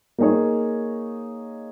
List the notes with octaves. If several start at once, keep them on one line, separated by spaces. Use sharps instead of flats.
A#3 D#4 G#4 C#5